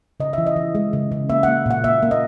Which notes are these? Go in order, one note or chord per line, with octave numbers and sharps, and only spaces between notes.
C#3 D#5
E3 E5
D#5
E3
G#3
C#3
C#3
A#3 E5
F#5
A#3
A#2 F#5
A#3 E5
A#3
D#5